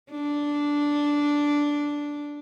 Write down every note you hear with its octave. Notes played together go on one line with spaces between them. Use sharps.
D4